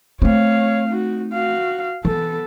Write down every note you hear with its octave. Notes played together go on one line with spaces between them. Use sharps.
A3 C4 C#5 F5
D#4 F#4
F#4 F5
E3 B3 A4